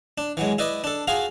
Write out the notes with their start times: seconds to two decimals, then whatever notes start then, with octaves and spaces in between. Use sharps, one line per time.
0.18 D4
0.37 E3 F#3 G#3
0.58 E4 B4 D5 D#5
0.84 D4 A4
1.08 F4 F#4 G#4 F5